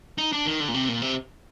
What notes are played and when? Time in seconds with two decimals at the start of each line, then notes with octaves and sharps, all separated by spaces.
0.18 D#4
0.32 D4
0.46 D#3
0.60 D3
0.69 A#2
0.74 C3
0.88 A#2
1.02 C3